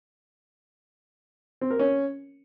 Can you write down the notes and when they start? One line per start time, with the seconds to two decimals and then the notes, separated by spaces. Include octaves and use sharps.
1.61 C4
1.70 A#4
1.79 C#4